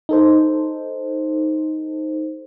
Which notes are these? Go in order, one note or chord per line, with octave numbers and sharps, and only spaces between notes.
D#4 A4 C5